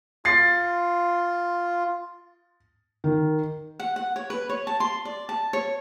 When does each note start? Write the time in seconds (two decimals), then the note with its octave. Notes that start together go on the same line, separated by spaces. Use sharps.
0.25 F4 A6 C7
3.04 D#3
3.80 F#5
3.96 F#5
4.16 C#5
4.30 B4
4.49 C#5
4.67 A5
4.80 C6
5.05 D5
5.29 A5
5.53 C#5